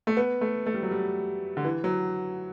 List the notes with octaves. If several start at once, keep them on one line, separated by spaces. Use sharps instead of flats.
A3
B3
A3
A3
G3
F#3
G3
D3
E3
F#3